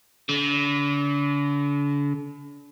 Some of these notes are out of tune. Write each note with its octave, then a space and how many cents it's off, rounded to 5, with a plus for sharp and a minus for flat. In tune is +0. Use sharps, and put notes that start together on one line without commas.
D3 -40